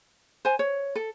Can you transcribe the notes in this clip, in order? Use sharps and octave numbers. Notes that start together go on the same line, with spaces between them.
C5 G#5
C#5
A4